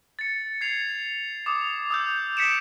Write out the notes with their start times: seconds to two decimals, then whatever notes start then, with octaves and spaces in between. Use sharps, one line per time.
0.19 A6 C#7
0.61 G#6 C7 F7
1.46 D6 D#6
1.90 D#6 E6 G6
2.37 B6 C#7 D7 E7